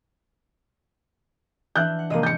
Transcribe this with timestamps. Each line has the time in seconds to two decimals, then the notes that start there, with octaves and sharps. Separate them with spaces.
1.76 E3 D4 E5 F#6 G6
1.99 F#5
2.10 F1 G#3 A#3 D#5 D#7
2.23 G6 C#7